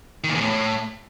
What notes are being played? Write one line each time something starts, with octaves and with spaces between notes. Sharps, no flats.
D#3
A#2
E2
A2